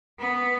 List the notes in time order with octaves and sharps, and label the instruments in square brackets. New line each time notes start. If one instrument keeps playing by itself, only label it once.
[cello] B3